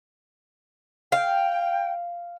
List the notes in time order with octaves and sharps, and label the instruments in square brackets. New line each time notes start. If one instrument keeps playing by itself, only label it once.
[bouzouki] F5 [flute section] G5